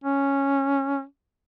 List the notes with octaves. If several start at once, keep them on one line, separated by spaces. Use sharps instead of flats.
C#4